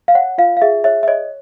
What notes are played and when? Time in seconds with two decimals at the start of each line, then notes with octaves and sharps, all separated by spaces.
0.08 F5
0.15 C#5 F#5
0.38 F4 F5
0.57 F5
0.62 G#4 E5
0.84 C#5 E5
1.03 E5
1.07 C#5 D#5